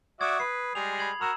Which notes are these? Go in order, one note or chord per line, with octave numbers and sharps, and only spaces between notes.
F#4 D5 E5 D#6 G#6
B4 C7
G3 G#3 G#4 F7
B5 G#6 F#7
F#4 A#4 A#5 E6 E7